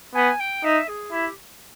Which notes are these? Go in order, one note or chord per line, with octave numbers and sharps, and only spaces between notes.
B3 G#5
G5
D#4 E5
G#4
E4 G4